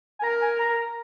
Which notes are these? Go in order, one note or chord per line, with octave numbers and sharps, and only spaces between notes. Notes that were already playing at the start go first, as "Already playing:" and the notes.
G#5
A#4 A#5
G#5
A#5